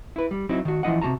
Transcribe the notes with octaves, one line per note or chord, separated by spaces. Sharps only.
E4 B4
G3
F#3 C4 D#4 E4
D#3 F#4
E3 F3 E4 D#5 F#5
C3 G#3 F#4 A5 A#5